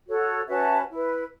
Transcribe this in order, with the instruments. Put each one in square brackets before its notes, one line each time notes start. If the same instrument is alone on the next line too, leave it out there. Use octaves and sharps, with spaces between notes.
[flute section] F#4 A4 C#5
C#4 F#4 B4 E5 A5
E4 B4